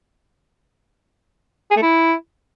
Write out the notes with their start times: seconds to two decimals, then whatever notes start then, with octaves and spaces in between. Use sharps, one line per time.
1.71 G#4
1.77 A3
1.82 E4